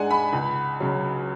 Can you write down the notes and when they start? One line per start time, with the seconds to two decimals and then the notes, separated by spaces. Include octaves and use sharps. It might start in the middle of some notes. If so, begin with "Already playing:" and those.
Already playing: G#2 G#3 D4 F#5 G#5
0.11 B5
0.33 C#2
0.80 C#3 F#3